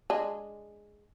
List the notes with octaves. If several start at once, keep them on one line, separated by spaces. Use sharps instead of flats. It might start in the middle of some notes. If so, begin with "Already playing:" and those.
G#3 D4